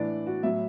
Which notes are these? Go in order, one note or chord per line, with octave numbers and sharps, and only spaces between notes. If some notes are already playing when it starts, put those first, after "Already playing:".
Already playing: A2 E3 D4 D5
F#4
A2 F#3 E4 E5